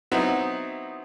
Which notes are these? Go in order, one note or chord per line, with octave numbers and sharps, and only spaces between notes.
F#3 B3 C4 D#4 E4 F#4